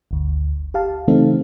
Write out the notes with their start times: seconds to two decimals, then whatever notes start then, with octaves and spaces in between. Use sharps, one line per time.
0.11 G1 D2
0.74 G4 F5 A5
1.08 C#3 E3 A3 C4 D#4 A4